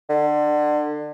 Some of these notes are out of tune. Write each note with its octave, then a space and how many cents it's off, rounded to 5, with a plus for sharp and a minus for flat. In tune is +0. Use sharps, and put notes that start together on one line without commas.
D3 +30